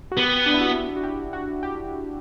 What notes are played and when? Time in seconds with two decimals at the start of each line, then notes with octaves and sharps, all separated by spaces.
0.12 F#4
0.16 B3 G4
0.46 D4
0.54 E4
0.61 F#4
0.96 F#4
1.04 G4
1.33 F#4
1.63 G4